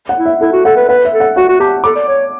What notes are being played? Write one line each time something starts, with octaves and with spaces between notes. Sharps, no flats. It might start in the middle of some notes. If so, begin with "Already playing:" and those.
F#5
E4
E5
E4 A4
F#4
A4 F#5
B4
B4 F#5
E5
A4
F#5
F#4 F#5
F#4
G4 A5
A4 D6
D5
C#5